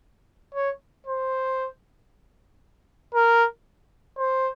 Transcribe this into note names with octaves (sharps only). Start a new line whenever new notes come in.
C#5
C5
A#4
C5